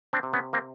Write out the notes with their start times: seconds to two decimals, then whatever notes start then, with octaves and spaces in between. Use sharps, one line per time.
0.13 C4 D4
0.23 C3
0.33 B3 C#4
0.53 A#3 C4